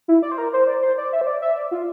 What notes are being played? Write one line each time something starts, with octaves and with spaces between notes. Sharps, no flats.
E4
D5
C5
A#4
C5
D5
C5
D5
E5
C5
D5
E5
D5
F4